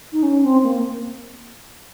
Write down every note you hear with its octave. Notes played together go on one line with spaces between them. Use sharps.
D#4
C#4
C4
A#3